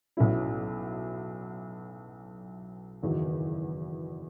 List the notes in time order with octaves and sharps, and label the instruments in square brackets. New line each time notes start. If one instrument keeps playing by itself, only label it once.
[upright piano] B1 B2 F#3 C#4 E4
F#1 E2 D#3 F#3